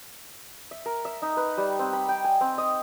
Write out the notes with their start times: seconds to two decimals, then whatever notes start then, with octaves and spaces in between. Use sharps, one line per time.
0.71 E5
0.86 A#4
1.05 E5
1.22 D#4
1.37 B4
1.57 G3
1.79 C4
1.93 B5
2.09 G5
2.24 G#5
2.41 C4
2.58 D#5